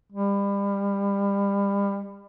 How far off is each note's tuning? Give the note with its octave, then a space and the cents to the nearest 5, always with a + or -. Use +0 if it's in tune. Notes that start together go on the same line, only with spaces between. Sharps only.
G3 +30